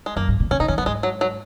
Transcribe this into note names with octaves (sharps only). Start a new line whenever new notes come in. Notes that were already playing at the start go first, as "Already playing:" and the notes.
G#3
F#2 A#3
G#2
A#2
B2 C#4
C#3 D#4
D#3 C#4
F#2 B3
G#2 G#3
F#3
F#3